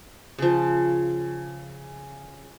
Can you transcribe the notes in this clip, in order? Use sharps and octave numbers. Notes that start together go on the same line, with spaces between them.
C#3 F3